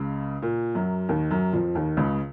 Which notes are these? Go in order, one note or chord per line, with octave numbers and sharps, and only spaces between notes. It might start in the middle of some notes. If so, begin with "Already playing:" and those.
Already playing: C#2 C#3
A#2
F#2 F#3
D#2 D#3
F#2 F#3
F2 F3
D#2 D#3
C#2 C#3